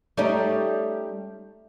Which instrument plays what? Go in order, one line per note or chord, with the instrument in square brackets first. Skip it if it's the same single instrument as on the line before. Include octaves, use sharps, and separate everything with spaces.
[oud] G3 C#4 D#4 [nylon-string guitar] A3